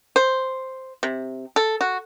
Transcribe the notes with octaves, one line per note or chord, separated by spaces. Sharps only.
C5
C3
A4
F#4